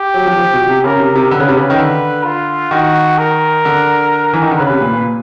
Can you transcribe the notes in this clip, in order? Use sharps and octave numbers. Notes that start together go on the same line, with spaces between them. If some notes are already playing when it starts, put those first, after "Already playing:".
Already playing: G4
F#3
F3
F3
B2
C3
C#3 A#4
C3
C3
D3 B4
C#3
C3
C#3
D#3
D3 B4
F4
D#3 F#4
A#4
D3
E3
D#3
D3
C#3 B4
C3
A#2
A#2